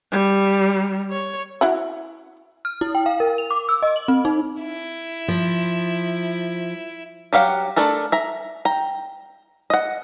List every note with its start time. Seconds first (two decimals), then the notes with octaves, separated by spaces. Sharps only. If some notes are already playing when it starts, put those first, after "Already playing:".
0.12 G3
1.11 C#5
1.61 E4 F#4 F#5
2.65 F6
2.81 E4
2.95 G5
3.06 F5
3.20 A#4
3.38 F7
3.51 D6
3.69 E6
3.82 D#5
3.96 F#7
4.08 C4
4.25 D#4
4.63 E4
5.28 F3
7.33 F#3 G4 F5 F#5
7.76 A3 D4 A4 A#4
8.12 E5 A#5
8.65 G5 A#5
9.70 D#5 F#5